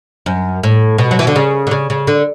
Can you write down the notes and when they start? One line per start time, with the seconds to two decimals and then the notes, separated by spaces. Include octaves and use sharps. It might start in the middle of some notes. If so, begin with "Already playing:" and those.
0.26 F#2
0.63 A2
0.98 B2
1.11 F#3
1.19 E3
1.27 D3
1.36 C#3
1.67 D3
1.71 C#3
1.90 C#3
2.07 D3